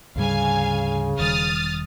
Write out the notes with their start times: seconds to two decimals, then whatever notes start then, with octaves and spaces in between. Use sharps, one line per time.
0.16 D2 G#2 C#3 G3 F5 G#5
1.19 E1 D#3 G3 D#6 F6 A6